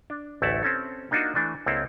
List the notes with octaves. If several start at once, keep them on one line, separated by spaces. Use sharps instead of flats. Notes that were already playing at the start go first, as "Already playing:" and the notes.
D4
A1 D2 A3 E4 F#5 A5
C4 C#4 A4
A#3 D4 D#4 F4 F#4
E3 A3 D4
C#2 A#3 C4 E4 A4